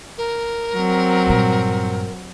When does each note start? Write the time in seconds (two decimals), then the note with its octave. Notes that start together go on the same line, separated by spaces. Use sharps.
0.18 A#4
0.75 F#3 C4
1.27 G2 A#2